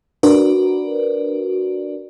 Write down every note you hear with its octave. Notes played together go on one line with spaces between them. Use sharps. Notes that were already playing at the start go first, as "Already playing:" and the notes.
D4 F#4 A#4 B4 D5